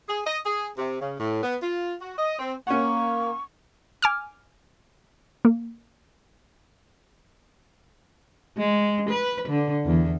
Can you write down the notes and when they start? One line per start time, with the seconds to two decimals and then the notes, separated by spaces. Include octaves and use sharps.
0.09 G#4
0.27 D#5
0.46 G#4
0.78 C3
1.01 C#3
1.19 A2
1.43 B3
1.62 F4
2.02 F#4
2.18 D#5
2.39 C4
2.67 A#3 C#4 F#5 C#6
4.02 G#5 D6 F6
5.45 A#3
8.57 G#3
9.09 B4
9.48 D3
9.86 E2